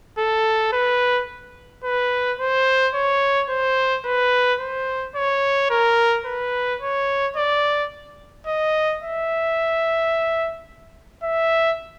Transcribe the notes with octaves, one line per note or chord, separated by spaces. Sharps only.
A4
B4
B4
C5
C#5
C5
B4
C5
C#5
A#4
B4
C#5
D5
D#5
E5
E5